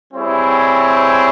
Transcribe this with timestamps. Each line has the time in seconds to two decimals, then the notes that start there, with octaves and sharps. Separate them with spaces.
0.13 G3 C4 E4 G#4 C#5